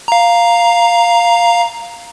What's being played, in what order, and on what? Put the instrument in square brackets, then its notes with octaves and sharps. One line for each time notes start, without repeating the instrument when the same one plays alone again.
[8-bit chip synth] F5 A#5